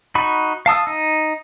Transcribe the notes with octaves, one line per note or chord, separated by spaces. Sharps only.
D#4 F#4 B5
F5 A5 D#6 E6
D#4